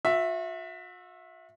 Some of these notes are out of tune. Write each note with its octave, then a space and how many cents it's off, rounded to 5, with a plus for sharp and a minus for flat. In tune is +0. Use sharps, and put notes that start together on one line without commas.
F#4 -45 E5 +0